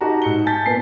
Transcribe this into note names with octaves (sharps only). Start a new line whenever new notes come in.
D#4 F#4 G4 A5 A#5
G#2 C#7 G7
G#5 A5 G6 A6 B6
A#2 B3 G#5 C7